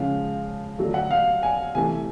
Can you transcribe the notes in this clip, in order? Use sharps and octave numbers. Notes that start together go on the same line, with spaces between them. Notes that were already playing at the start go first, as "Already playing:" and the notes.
Already playing: C#3 F3 G#3 F5
D3 F#3 A3
F#5
F5
G#5
C3 E3 A3 G#5